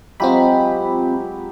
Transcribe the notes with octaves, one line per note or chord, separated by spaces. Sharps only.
F#3 G#3 C4 F4 G4 B5